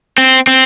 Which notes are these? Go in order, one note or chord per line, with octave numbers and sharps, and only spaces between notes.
C4
C4